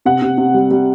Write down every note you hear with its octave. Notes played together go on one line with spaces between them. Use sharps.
C3 F#5
C3
C3
G3
G3